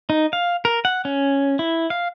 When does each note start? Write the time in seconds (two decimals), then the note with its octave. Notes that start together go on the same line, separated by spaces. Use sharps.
0.10 D#4
0.33 F5
0.65 A#4
0.85 F#5
1.05 C#4
1.59 E4
1.90 F5